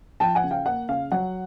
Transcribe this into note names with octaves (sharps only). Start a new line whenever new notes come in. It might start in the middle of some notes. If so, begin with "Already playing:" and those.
F3 G5 A5
F#5 G#5
C#3
F5 G5
A#3 F#5
C#3 F5
F#3 F#5